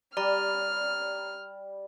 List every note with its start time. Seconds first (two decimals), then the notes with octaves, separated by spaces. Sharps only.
0.17 G3 D5 A#5 F6